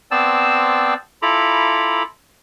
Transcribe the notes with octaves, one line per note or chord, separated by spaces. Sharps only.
B3 C4 C5 D5 A5 E6
E4 F4 A4 A#5 B5 D6